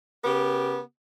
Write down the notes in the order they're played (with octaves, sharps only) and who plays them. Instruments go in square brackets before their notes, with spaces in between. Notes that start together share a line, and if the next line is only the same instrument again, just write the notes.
[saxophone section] C#3 B3 G4 A#4